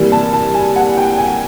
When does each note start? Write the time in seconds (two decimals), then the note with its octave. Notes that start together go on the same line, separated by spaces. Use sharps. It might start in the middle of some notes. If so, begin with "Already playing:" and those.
Already playing: C3 E3 G3 A#3
0.12 A5
0.33 A5
0.54 G#5
0.76 F#5
0.98 G5
1.18 G#5